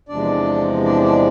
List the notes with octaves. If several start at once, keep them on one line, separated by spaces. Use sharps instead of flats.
E2 C3 F3 G#3 D4 D5
D4 D5
D4 D5